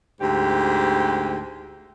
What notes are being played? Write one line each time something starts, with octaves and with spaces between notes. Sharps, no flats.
D2 G#2 G4